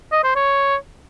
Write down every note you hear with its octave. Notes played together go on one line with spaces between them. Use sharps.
D#5
C5
C#5